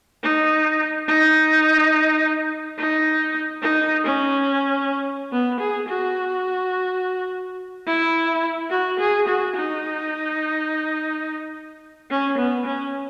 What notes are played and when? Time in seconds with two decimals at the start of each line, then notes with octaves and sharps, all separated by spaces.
0.23 D#4
1.08 D#4
2.78 D#4
3.62 D#4
4.04 C#4
5.32 B3
5.60 G#4
5.89 F#4
7.87 E4
8.70 F#4
8.99 G#4
9.28 F#4
9.56 D#4
12.10 C#4
12.38 B3
12.66 C#4